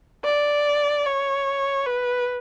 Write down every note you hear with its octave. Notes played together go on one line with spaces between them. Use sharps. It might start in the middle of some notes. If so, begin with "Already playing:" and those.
D5
C#5
B4